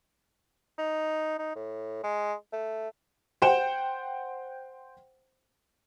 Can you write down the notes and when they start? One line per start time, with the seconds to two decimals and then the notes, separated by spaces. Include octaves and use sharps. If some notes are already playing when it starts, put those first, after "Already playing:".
0.78 D#4
1.39 D#4
1.55 A2
2.03 G#3
2.53 A3
3.42 C5 F#5 G5 E7